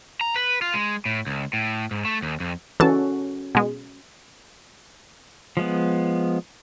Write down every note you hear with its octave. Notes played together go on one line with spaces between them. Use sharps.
A#5
B4
F4
G#3
A2
C#2
A2
G#2
A3
D#2
F2
E3 C#4 F#4 A4 A5
B2 G#3
F3 G#3 B3